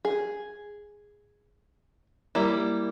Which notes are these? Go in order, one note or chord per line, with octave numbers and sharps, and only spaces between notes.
G#4
G3 A#3 E4